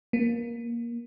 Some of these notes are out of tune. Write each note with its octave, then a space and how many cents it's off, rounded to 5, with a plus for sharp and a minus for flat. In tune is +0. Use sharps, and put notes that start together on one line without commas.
A#3 +15